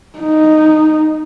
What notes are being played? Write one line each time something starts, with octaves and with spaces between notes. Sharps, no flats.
D#4